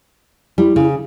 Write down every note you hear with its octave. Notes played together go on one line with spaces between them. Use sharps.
G3 E4
C#3